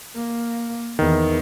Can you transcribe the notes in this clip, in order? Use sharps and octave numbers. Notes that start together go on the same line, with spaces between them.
A#3
E2 D#3